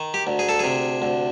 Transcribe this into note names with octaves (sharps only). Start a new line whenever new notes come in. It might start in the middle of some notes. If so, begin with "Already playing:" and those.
Already playing: D#3
G4
D2
G#4
A4
C3 G#4
D2